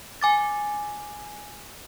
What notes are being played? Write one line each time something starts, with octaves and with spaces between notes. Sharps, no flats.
G#5 D6 A6